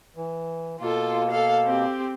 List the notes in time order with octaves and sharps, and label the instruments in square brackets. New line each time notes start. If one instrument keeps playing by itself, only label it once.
[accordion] E3
[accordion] B2 A#3 [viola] F4 A4
[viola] A4 F5
C4 G4